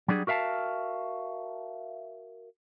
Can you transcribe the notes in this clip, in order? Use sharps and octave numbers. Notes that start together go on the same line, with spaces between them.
F#3 G3 D4 G#4
F#4 A#4 E5 F5 A5